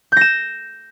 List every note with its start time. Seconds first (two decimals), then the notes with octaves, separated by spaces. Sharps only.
0.12 G6
0.17 A#6
0.21 E7